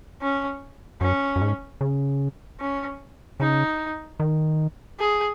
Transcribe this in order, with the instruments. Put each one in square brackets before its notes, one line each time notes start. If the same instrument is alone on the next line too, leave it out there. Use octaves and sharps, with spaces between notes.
[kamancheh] C#4
[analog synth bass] F#2 [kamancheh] C#4
[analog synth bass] F#2
G#2
C#3
[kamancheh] C#4
[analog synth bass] C#3 [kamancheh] D#4
[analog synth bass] D#3
[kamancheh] G#4